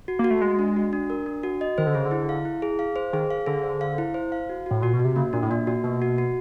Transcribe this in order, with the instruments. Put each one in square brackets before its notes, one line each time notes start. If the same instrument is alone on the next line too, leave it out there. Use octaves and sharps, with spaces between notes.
[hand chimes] F#4
[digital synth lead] A#3
[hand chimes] F#4
[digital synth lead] A3
[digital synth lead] G#3 [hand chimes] D#5
[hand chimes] D4
F#4
D4
A#4
D4
F#4
D#5
[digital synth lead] D#3 [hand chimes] C5
[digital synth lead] D3
[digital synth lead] C#3 [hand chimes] G#4
[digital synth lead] D3
[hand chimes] E4
F5
E4
G#4
F5
C5
[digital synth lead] D#3 [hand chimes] G#4
[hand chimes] F5
[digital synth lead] D3 [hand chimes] G#4
[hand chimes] C5
F5
E4
C5
F5
F#4
[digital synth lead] A2 [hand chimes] F#4
[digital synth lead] A#2 [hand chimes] F#4
[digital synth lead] B2
[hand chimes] F#4
[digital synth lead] C3
[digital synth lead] C#3 [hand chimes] A#3
[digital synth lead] A#2 [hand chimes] D4
[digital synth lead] A2
[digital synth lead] A#2 [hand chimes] A#3
[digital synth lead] A#2 [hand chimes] F#4
[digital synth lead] B2 [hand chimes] A#3
[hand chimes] F#4
F#4